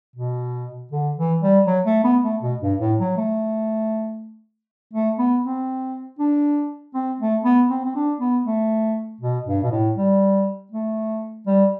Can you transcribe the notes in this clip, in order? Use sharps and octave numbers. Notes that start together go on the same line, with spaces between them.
B2
D3
E3
G3
F#3
A3
B3
A3
B2
G2
A2
F#3
A3
A3
B3
C4
D4
C4
A3
B3
C4
C4
D4
B3
A3
B2
G2
B2
A2
G3
A3
G3